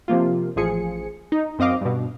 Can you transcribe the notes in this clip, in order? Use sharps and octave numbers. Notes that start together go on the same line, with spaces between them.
C3 F3 A#3 F4
A1 F3 G#4 C#7
D#4
F#2 C4 D#5 F5 D6
G2 B2